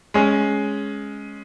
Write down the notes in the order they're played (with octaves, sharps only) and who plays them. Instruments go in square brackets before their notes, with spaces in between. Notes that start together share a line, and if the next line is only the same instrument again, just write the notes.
[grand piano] G#3 C#4